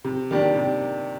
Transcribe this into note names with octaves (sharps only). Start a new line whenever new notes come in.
C3
D#3 A#3 D4 G4
C3